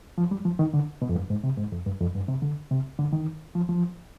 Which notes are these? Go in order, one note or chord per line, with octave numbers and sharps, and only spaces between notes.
F3
G3
F3
D#3
D3
B2
F2
G2
G#2
C3
G#2
F2
G2
F2
G2
C3
D3
C3
D3
D#3
F3
F3